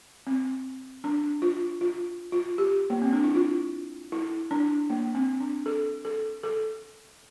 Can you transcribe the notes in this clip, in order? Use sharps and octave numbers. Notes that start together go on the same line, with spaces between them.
C4
D4
F4
F4
F4
G4
A#3
C4
D4
E4
F4
E4
D4
A#3
C4
D4
A4
A4
A4